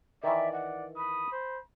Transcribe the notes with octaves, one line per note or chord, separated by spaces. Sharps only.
D#3 E3 D5 E5
D5 F#5
B5 D#6
C5